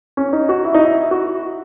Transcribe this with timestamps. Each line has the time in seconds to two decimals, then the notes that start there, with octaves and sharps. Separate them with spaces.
0.17 C#4
0.33 D#4
0.49 F#4
0.65 E4
0.74 D#4
0.80 E4
1.11 F#4